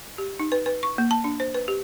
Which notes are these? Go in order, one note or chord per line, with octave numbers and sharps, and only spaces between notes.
G4
D#4
B4
B4
C#6
A#3
A5
D4
C5
B4
G4